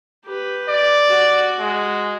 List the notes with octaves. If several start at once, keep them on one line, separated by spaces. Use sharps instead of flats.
G4 B4
D5
F#4
G#3